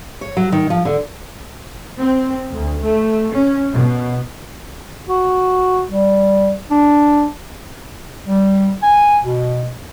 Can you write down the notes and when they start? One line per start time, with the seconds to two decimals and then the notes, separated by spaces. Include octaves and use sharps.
0.21 C#5
0.37 F#3
0.52 D#3
0.70 F3
0.85 D3
1.98 C4
2.51 D2
2.83 A3
3.34 C#4
3.72 B2
5.09 F#4
5.91 G3
6.70 D4
8.27 G3
8.83 G#5
9.24 B2